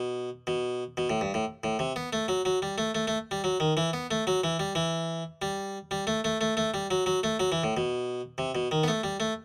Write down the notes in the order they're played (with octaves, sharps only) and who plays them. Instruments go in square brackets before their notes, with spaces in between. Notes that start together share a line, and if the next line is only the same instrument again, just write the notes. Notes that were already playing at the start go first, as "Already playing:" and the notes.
Already playing: [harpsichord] B2
B2
B2
A2
G2
A2
A2
C3
B3
A3
F#3
F#3
G3
A3
A3
A3
G3
F#3
D#3
E3
B3
A3
F#3
E3
G3
E3
G3
G3
A3
A3
A3
A3
G3
F#3
F#3
A3
F#3
E3
A2
B2
C3
B2
D#3
B3
A3
G3
A3